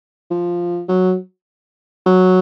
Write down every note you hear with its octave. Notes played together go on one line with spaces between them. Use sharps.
F3
F#3
F#3